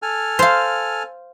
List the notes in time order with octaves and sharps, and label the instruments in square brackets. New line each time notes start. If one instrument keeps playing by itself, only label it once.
[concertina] A4 G#5 F6
[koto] C5 F5